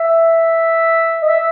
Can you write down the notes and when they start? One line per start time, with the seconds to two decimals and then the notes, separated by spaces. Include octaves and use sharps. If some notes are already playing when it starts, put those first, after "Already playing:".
Already playing: E5
1.22 D#5
1.28 E5